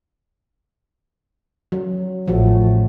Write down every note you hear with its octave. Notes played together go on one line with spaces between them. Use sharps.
F#3
A1 F3 A3 F#4